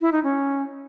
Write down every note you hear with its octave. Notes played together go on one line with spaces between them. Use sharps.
E4
D#4
C#4